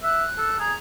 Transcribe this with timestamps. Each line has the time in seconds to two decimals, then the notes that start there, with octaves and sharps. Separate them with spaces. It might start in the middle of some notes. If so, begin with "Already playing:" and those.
0.03 E5 F#6
0.38 A4
0.59 G#4 A#5